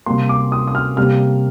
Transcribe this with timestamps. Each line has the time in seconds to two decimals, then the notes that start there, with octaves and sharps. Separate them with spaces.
0.06 C3 G3 A#3 C6
0.29 D6
0.52 D#6
0.68 D#6
0.75 F6
0.97 C3 G3 A#3 F6